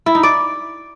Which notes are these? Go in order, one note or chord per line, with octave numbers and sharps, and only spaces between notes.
E4
D#4
D5